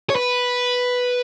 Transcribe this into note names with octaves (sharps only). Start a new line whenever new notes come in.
C#5
B4